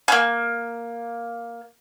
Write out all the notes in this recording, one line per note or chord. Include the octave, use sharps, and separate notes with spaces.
A#3 C#4